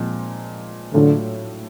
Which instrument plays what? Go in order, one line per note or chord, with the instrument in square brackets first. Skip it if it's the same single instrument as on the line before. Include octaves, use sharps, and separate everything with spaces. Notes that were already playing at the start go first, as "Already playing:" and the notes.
Already playing: [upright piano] A#2 F3 G#3 C4
[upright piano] A2 F#3 A3 D4 F4 [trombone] D3